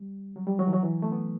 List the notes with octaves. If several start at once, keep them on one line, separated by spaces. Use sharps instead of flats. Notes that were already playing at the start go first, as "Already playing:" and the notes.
Already playing: G3
F#3
G3
F#3
E3
F#3
E3
A3
B3